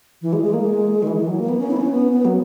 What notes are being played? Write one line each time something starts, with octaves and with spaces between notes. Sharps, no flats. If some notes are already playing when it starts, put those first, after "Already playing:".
E3
G#3
G#3
A#3
G#3
D#3
E3
E3
F#3
A#3
B3
C#4
E4
B3
C#4
B3
B3
F#3